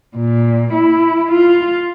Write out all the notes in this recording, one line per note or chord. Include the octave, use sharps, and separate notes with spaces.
A#2
E4
F4